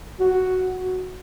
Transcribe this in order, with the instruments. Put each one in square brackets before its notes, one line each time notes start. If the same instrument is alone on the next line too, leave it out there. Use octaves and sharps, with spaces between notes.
[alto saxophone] F#4